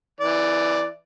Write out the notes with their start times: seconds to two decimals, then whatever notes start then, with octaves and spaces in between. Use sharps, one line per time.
0.20 E3 D5